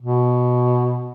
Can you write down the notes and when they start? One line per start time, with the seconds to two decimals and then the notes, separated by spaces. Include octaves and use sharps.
0.02 B2